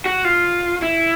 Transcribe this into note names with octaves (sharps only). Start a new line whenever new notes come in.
F#4
F4
E4